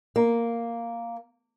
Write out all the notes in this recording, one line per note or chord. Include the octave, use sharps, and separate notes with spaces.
A#3